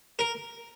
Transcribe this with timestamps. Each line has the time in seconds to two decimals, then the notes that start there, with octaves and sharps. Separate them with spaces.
0.19 A#4